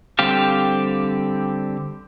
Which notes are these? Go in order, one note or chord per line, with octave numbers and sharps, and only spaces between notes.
D3 G3 C4 G4 F5